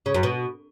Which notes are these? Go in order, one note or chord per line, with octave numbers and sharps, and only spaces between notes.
C#3
F#2
B2